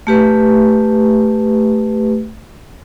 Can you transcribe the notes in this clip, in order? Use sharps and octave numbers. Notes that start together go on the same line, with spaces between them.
A3 G4 B4